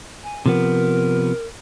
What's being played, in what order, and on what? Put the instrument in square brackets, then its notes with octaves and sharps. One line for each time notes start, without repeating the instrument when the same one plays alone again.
[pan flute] G#5
[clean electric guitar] C3 F3 B3 [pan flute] A#4